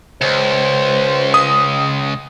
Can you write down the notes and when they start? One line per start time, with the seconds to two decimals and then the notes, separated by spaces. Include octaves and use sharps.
0.21 C#2 C5
1.34 D#6